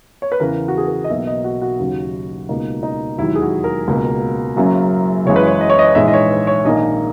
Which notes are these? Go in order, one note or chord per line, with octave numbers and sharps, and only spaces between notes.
C#5
B4
E2 C#3 E3 A#4
F#4
G#4
A#4
D#5
B1 B2 A#3 E5
D#5
F#4
F#4
D#2 C#3 F#3
C#2 B2 A#3 D#4
D#4
E1 D#2 D#3 F#3 E4
G#4
F#4
A#4
C#2 B2 A#3
F#1 F#2 C#3 F#3 A#3
F#1 F#2 C#3 E3 G#3 C#5
B4
C#5
D#5
C#5
D#5
A#1 G#2 E3 G#3 E5
D#5
C#5
B4
C#5
A#1 G#2 D#3 A#3 D#5